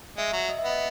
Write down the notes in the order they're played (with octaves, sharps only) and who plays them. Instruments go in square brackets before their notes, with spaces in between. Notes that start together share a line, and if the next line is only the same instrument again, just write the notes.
[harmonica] G#3 [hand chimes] E5
[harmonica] F#3
[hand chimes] D#5
E5
[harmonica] B3 [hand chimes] D#5